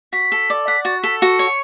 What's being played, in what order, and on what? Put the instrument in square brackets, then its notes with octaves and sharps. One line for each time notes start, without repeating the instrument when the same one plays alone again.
[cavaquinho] F#4 [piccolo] B6
[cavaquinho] A4
D5
[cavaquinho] F#5 [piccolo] B6
[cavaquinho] F#4 [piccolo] A6
[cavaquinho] A4 [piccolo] B6
[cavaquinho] F#4 [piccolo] C#7
[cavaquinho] C#5